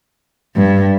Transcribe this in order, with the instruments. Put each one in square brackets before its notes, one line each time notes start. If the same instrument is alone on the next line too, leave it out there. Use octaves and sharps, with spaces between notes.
[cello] G2